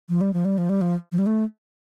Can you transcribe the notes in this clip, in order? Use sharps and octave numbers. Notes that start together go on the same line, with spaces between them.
F3
G3
F3
G3
F3
G3
F3
F3
G3
A3